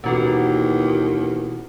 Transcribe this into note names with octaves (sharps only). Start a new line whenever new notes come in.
D#2 B2 E3 C#4 F4 F#4 A4